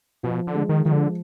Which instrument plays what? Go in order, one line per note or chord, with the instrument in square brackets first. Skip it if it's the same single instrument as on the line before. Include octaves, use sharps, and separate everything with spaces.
[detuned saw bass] B2 [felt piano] F3
[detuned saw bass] D3
[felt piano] G#3
[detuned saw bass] D#3
[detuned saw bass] D#3 [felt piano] F3
[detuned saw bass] D3